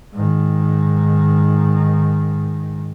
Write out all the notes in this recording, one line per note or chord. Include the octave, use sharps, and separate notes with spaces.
G#2 D#3